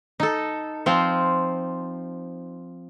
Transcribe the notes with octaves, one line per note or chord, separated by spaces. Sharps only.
D#4 A4
F3 C4 F4